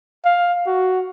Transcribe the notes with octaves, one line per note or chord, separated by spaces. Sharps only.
F5
F#4